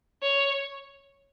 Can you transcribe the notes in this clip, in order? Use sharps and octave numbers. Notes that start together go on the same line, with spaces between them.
C#5